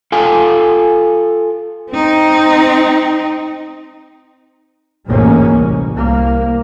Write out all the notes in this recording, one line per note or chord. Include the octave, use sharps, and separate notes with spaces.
F4 A4 F5 G5 G#5
C4 D#4
A1 D2 G#2 G#3 A#3 C#4
C2
C2 A#3